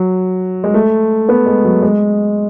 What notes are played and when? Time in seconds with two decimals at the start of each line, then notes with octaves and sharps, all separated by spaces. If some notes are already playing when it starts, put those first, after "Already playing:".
Already playing: F#3
0.64 G#3
0.74 A3
1.29 B3
1.46 G#3
1.64 F#3
1.82 G#3